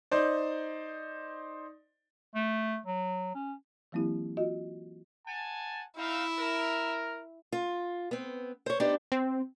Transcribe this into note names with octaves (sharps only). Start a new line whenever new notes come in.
D#4 C5 D5
A3
F#3
C#4
E3 F#3 A#3 C4 E4 G4
F4 F#4 D#5
F#5 G#5 A5
C4 D#4 E4 E5 F5
A#4
F4
B3 C4
C5 C#5
B3 D4 D#4 G4 C5
C4